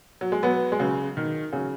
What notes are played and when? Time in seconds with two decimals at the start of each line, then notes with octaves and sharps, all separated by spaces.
0.21 F#3
0.32 G#3
0.43 F#3 B3
0.72 G#3
0.79 C#3 F#3
1.17 D#3
1.52 C#3 F#3